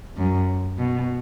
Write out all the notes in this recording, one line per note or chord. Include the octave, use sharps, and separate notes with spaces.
F#2
B2